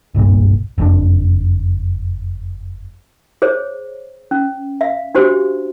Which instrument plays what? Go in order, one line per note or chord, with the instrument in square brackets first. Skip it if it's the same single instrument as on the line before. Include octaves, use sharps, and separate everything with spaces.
[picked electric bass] F#1 C2 G2 A#2
F#1 F2 A#2 D4
[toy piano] G#4 C5 C#5
C#4
E5 F5
D4 F#4 G4 C5